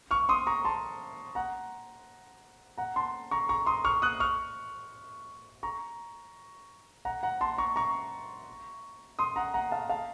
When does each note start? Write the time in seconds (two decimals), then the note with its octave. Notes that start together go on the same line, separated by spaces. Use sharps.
0.11 C#6 F6
0.29 C6 D#6
0.47 A#5 C#6
0.65 A5 C6
1.35 F#5 A#5
2.78 F#5 A#5
2.96 A5 C6
3.31 A#5 C#6
3.49 A#5 C#6
3.66 C6 D#6
3.84 C#6 F6
4.02 D#6 F#6
4.20 C#6 F6
5.63 A#5 C#6
7.05 F#5 A#5
7.23 F#5 A#5
7.41 A5 C6
7.58 A#5 C#6
7.76 A#5 C#6
9.19 C6 D#6
9.36 F#5 A#5
9.54 F#5 A#5
9.71 F5 A5
9.89 F5 A5